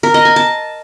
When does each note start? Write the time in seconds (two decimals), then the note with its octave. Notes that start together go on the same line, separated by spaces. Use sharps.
0.03 A#4
0.14 D#5
0.25 G#5
0.36 A5